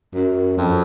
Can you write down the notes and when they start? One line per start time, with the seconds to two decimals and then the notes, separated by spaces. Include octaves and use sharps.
0.14 F#2
0.57 F2